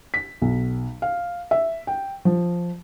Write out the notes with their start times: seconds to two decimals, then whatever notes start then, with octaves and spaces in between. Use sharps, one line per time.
0.14 B6
0.42 B1
1.02 F5
1.51 E5
1.87 G5
2.25 F3